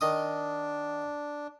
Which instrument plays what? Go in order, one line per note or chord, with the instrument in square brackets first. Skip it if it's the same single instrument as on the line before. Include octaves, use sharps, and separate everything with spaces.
[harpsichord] D#3 D#5 D#6 [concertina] D4